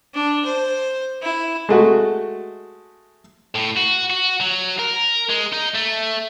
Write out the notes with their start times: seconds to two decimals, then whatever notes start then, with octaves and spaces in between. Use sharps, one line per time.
0.14 D4
0.45 C5
1.22 E4
1.69 G#3 A3 F#4
3.55 A2
3.76 F#4
4.10 F#4
4.41 F#3
4.79 A#4
5.29 G#3
5.52 D#4
5.74 A3